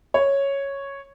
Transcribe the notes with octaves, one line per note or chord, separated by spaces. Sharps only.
C#5